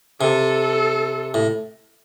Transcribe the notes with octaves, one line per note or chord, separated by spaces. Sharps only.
C3 A4
A2